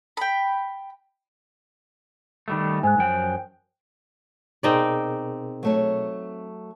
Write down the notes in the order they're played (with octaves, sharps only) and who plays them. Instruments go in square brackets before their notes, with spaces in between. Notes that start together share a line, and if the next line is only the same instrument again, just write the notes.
[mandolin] G5 B5
[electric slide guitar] D#3 G3 A3
[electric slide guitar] G#2 [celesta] G#5 F#6
[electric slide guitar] F#2 F3 G5
[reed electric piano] B2 G#4 A#4 [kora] C4 D#4 D5
[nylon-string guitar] F#3 A3 C#5